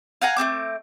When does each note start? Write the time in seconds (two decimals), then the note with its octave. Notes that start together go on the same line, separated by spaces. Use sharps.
0.22 F5 F#5 G#5 A#5
0.37 A3 B3 C4 D6